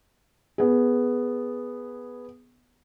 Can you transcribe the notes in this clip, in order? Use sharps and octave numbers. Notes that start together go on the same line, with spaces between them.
B3 G#4